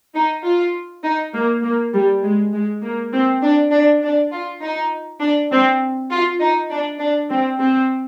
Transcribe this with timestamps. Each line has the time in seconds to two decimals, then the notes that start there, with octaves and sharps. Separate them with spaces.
0.15 D#4
0.44 F4
1.04 D#4
1.34 A#3
1.63 A#3
1.94 G3
2.23 G#3
2.54 G#3
2.82 A#3
3.13 C4
3.43 D4
3.72 D4
4.03 D4
4.32 F4
4.62 D#4
5.21 D4
5.51 C4
6.11 F4
6.40 D#4
6.71 D4
7.00 D4
7.30 C4
7.59 C4